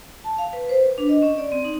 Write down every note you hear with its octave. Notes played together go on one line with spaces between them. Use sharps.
A5
F5
B4
C5
B4
D4
D#5
C#4
D5
C4
D#4